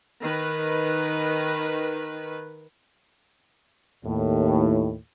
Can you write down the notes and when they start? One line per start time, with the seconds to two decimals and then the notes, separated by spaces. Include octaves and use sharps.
0.22 D#3 B4
4.04 D#2 A2